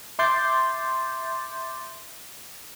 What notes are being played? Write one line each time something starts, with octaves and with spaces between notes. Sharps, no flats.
E5 C6 D6 G6 A6